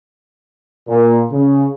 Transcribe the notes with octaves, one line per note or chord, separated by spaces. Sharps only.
A#2
C#3